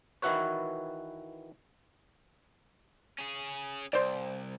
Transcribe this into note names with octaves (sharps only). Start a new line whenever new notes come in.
D#3 E3 E4 F#4 B4 C#5
C#4 G#4
C2 C5 D5